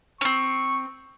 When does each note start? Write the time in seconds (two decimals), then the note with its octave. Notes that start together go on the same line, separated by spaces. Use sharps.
0.21 C4 C#4 C#6